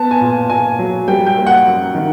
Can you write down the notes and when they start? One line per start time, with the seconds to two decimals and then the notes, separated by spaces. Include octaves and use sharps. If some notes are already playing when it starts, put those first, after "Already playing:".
Already playing: B3 A5
0.11 G#5
0.21 A#2
0.50 A#2 G#5
0.79 F#3
1.08 G3 G5
1.27 G5
1.37 A#3
1.47 F#5
1.65 F#2
1.95 D#3